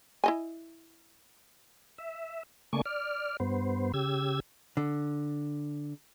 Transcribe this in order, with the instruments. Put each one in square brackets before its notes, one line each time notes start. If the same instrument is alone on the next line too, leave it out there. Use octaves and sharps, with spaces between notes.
[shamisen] E4 D#5 G#5
[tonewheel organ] E5
C#3 A3 A#3 D5 G#5 C#6
D5 F6
G2 B3 C5
C#3 G4 E6 G#6
[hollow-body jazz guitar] D3